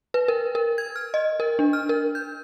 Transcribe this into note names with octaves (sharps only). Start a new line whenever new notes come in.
B4
A#4
A#4
G#6
F6
D#5
A#4
D4
F6
A#4
G6